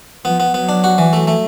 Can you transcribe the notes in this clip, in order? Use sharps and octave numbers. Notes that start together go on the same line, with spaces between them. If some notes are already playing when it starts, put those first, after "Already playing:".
F3 B3
B3
F#3 B3
D4
F#4
E3
F#3 A3
A3